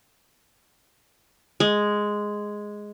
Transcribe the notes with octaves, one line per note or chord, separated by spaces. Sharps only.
G#3